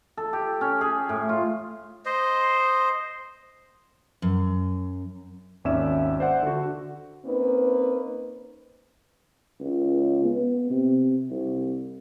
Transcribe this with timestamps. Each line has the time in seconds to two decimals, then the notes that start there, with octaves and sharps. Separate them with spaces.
0.17 A4
0.33 G4
0.61 C#4
0.81 G#4
1.09 A2
1.29 F4
2.06 C5 D#5
4.22 F#2
5.64 G#1 D#2 C#4 D5 E5 E7
6.20 C5 D5 E5 F#5
6.43 D3 F#4
7.25 A#3 C4 C#4 D#4 B4
9.60 C#2
10.24 B3
10.70 C3
11.30 C2